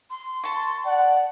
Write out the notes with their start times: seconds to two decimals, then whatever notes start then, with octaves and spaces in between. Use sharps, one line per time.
0.10 C6
0.44 A5 C#6
0.85 D5 F#5